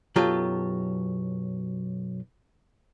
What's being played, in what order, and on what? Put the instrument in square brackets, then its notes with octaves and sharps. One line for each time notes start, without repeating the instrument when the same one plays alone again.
[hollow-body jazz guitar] B1 F#2 F#3 F4 G4 A4